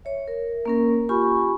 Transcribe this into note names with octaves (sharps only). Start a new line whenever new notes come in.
C#5 E5
A#4
A#3 C#4 A#4
F4 G4 G#5 B5 C#6